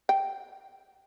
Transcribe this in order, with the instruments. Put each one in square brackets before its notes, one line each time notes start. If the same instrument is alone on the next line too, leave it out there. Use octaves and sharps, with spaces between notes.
[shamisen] G5